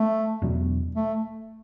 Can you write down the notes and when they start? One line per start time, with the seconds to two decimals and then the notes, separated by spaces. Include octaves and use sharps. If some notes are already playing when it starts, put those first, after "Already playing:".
Already playing: A3
0.42 E2 B2 F#3 D4
0.95 A3